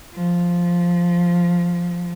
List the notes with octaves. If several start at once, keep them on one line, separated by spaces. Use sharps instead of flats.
F3